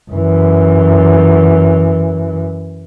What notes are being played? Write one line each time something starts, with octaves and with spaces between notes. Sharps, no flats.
F#2 E3